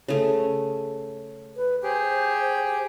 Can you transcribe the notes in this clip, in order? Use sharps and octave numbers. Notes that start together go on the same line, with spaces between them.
C#3 A3
B4
G4 G#4 C5